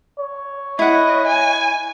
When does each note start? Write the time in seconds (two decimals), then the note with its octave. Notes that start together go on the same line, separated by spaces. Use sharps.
0.19 C#5
0.79 E4 D#5 F#5
1.27 G#5